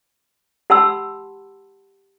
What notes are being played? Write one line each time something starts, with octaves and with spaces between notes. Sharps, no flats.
G4 F#5 A5 B5 C6 E6